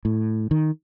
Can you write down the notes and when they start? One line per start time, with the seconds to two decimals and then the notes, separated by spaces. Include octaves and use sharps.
0.05 A2
0.51 D#3